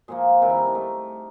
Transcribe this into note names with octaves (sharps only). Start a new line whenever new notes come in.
A#2 F3 A#3 G#4
C3 D#3 G3 A#4
E4
D#4
D4
A3 D#4